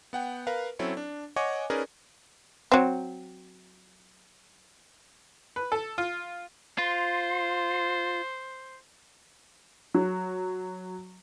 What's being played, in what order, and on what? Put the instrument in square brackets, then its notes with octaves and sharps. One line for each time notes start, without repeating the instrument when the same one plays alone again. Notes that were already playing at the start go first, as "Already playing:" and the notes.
[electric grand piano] B3 F#5 G5
A#4 B4 F5
F#3 C4 C#4 E4 A4 C#5
D4
C#5 D#5 F#5 G#5 C#6 D6
C#4 D#4 G#4 A#4 B4 D5
[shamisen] F#3 C4
[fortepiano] B4
A4
F4
[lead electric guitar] F4 [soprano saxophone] C5
[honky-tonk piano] F#3